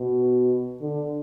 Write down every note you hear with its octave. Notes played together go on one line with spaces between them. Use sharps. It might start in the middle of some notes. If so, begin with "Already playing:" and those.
Already playing: B2
D3